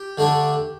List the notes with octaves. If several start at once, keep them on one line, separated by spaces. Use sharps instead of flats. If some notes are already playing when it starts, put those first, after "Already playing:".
Already playing: G4
D3 A3 D4